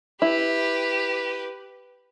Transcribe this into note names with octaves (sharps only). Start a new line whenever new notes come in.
E4 G4 B4